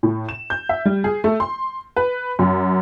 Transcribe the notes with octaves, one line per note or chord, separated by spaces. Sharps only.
A2
E7
G6
E5
G3
G#4
A3
C6
B4
F#2